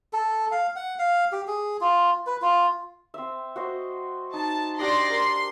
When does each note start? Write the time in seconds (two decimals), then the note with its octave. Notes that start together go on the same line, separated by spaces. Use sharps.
0.13 A4
0.52 F5
0.76 F#5
0.99 F5
1.32 G4
1.47 G#4
1.81 F4
2.27 B4
2.42 F4
3.14 C4 E5
3.56 F#4 C5 D#5
4.33 D#4 A5
4.79 D4 G4 D5 D#5 C6 A#6
5.10 A#4 C6